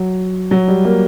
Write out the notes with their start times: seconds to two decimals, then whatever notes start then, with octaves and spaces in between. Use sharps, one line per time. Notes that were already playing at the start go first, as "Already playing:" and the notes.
Already playing: F#3
0.51 F#3
0.68 G3
0.85 A#3